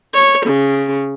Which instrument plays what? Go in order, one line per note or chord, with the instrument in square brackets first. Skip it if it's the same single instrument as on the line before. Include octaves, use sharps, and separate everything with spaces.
[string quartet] C#5
C#3